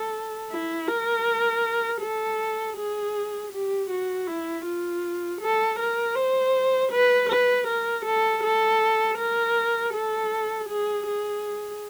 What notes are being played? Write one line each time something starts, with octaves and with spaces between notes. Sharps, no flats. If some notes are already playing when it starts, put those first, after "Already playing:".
Already playing: A4
E4
A#4
A4
G#4
G4
F#4
E4
F4
A4
A#4
C5
B4
B4
A#4
A4
A4
A#4
A4
G#4
G#4